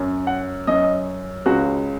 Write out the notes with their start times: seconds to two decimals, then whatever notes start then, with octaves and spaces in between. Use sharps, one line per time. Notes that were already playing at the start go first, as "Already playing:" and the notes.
Already playing: F#2 F#3 C#4
0.27 F#5
0.67 F#2 F#3 C#4 D#5
1.46 C#2 C#3 G#3 C#4 F#4